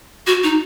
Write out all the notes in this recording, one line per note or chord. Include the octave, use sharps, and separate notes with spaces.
F#4
D#4